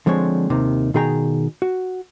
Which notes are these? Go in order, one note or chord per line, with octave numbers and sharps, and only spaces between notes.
D3 F3 G#3 C4 C#5
D#2 C3 D#3
B2 D#3 G#4 G5 A#5
F#4